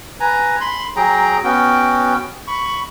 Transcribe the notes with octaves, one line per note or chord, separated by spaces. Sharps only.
B4 G#5 A#5
B5 C6
F#3 G#4 G5 A#5
B3 C#4 F#4 G5
B5 C#6